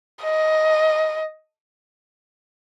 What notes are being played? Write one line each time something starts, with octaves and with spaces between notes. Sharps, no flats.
D#5